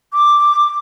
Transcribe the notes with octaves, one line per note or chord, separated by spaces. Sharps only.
D6